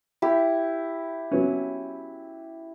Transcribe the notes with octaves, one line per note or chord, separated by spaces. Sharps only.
E4 G4
F#3 B3 C#4